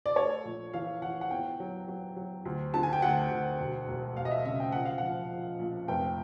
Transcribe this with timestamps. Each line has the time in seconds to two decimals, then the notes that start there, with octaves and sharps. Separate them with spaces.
0.06 D5
0.16 A3 C#5
0.45 A#1
0.73 E3 F5
1.02 E3 F#5
1.21 F#5
1.31 E2 G5
1.60 F#3
1.88 F#3
2.16 F#3
2.45 D2
2.74 D3 A5
2.83 G#5
2.93 G5
3.02 D2 F#5
3.31 D2
3.60 E1
3.88 E1
4.17 E1 F5
4.25 D#5
4.31 E5
4.45 C#3 E5
4.60 G5
4.72 A#1 F#5
4.85 F5
4.98 F3 F#5
5.31 F3
5.59 A#1
5.88 F1 G5